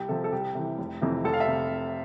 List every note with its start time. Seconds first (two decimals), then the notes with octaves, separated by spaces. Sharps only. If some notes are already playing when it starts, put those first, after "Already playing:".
Already playing: C2 G4
0.09 C3 F3 A4
0.24 A4
0.32 C2 G4
0.55 C3 E3
0.78 F1
1.02 F2 C3 E3
1.24 F1 A4
1.34 F5
1.40 E5
1.47 C3